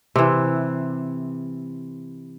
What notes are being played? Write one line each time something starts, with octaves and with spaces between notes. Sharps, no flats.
C3 E3